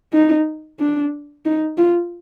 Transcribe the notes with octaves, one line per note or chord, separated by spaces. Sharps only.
D#4
D4
D#4
F4